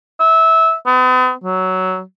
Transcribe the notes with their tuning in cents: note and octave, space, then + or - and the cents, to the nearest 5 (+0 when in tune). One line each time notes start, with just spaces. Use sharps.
E5 -20
B3 +45
F#3 +10